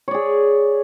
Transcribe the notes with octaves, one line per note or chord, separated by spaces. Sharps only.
G#4 C#5 D5